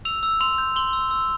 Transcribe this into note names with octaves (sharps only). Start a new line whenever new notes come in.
E6 F7
E6
C6 F7
G6
C6 G7
E6
E6